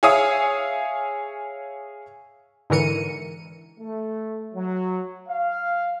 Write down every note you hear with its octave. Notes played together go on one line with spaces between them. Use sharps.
G#4 C#5 E5 F5 G#5 D#6
G#2 D3 E3 A#4 C#7 D#7
A3
F#3
F5